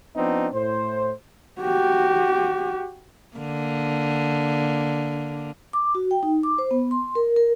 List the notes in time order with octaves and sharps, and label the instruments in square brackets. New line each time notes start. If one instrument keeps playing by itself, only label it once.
[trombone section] F3 B3 C4 D4 D#4
A2 C5
[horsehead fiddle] F#4 G4
[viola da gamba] D3 A#3
[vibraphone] D6
F#4
G5
D#4
D6
C5
B3
C6
A#4
A#4